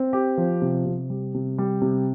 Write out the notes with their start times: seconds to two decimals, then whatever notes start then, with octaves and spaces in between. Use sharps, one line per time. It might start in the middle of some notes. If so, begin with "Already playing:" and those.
Already playing: C4
0.13 G4
0.37 F3
0.62 C3
0.86 C3
1.10 G3
1.34 C3
1.58 G3
1.81 C3